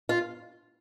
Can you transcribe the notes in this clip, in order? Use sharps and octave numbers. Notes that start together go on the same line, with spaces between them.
F4